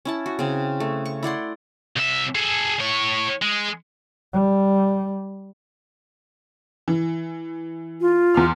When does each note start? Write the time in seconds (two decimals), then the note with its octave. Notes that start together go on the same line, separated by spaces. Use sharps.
0.05 C#4 E4 A5
0.26 F#4
0.39 C#3 C4
0.80 A3
1.05 C#6
1.23 E4 D5 F#5 C6
1.96 C2 E5
2.35 G#4 A4
2.79 A2 C#5
3.42 G#3
4.33 G3
6.88 E3
8.01 F4
8.34 E2 C6 F6